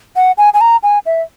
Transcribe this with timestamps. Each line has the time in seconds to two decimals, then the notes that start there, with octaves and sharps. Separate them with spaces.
0.16 F#5
0.38 G#5
0.54 G#5
0.61 A#5
0.83 G#5
1.06 E5